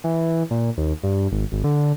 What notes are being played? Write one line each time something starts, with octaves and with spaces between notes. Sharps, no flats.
E3
A#2
D#2
G2
G#1
G#1
D3